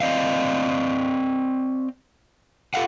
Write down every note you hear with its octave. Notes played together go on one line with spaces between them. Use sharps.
C4 D5 D#5 F5
F4 A4 F5 F#5